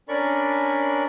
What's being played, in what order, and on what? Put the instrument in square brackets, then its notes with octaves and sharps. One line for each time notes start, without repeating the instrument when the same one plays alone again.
[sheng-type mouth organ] C#4 D4 A#4 D5 B5 C#6